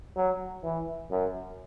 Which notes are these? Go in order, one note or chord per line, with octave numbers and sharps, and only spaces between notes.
F#3
E3
F#2